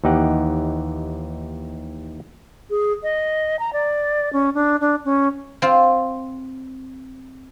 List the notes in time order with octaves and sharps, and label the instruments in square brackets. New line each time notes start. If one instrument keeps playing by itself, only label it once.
[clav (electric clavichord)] D#2 E3 D#4 G4 F#5
[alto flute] G#4
D#5
A#5
D5
C#4
D4
D4
C#4
[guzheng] C4 F4